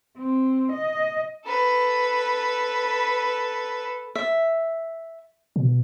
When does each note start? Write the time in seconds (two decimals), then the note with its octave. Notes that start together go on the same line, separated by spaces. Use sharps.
0.18 C4
0.72 D#5
1.46 A4 B4
4.15 E5
5.56 B2